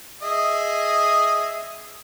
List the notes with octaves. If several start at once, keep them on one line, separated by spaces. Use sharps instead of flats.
G#4 D#5 E5